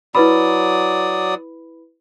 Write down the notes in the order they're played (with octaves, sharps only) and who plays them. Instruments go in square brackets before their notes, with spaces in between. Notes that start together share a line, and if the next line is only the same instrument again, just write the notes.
[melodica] F#3 D5 D#6 [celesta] E4 B4 B5